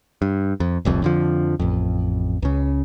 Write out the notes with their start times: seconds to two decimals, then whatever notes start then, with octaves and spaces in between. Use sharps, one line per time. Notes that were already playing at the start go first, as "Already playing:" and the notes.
0.22 G2
0.60 F2
0.85 D1 C2 F2
1.02 F2 D3 F3
1.59 A1 F2
2.42 C#2 C#3